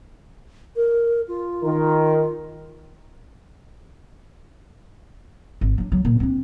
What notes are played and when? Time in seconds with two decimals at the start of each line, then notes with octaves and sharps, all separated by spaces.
0.76 A#4
1.28 F4
1.63 D#3 A#4
5.61 G#1
5.78 F#3 D4
5.92 F#3 B3
6.05 A#1 A#2
6.20 C4 D4